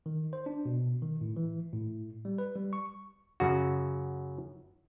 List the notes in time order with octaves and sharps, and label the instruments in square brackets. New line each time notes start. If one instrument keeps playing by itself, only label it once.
[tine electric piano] D#3
C5
D4
B2
D#3
A2
E3
A2
G3
B4
G3
C#6
[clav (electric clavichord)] F#2 C#3 F#4